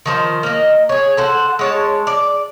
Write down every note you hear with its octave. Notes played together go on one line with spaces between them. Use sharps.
D#3 F3 C5
A#3 D#5
G#4 C#5
A4 C5 F#5
G#3 C#5 A5
D5